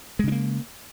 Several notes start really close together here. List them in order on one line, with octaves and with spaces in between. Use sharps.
G#3 C#3 D4 A#3